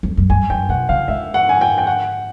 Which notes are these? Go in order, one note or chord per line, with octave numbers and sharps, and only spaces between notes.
F2
F#2
G2 G#5
F#2 G5
B2 F#5
C#3 F5
G#2 E5
F#5
G#5
G5
G5
F#5